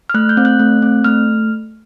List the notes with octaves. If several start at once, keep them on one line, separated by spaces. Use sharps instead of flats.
F6
A3 F#6
G6
C4
F#6
A3
C4
A3 F6